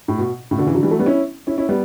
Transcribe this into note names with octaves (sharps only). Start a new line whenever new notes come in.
A2
B2
A2 C#3
B2 D3
C#3 E3
D3 F#3
E3 G3
F#3 A3
G3 B3
C#4 E4
C#4 E4
C#4 E4
G3 B3